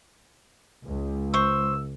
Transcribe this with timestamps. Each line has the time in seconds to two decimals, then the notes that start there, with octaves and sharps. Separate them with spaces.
0.86 C#2
1.34 C5 C#6 E6